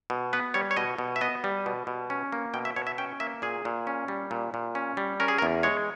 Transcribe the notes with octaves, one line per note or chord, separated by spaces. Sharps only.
B2
B3 B4
G3 C#5
C#5
B2 D#5
B2
E5
B3 D#5
G3
B2
B2
C#4
A#3
B2 G5
E5
B2 C#5
E5
C#4 G5
A#3 E5
A#2 G#4
A#2
C#4
G3
A#2
A#2
C#4
G3
C#4 A#4
G#4
A#4
E2
G#3 C#5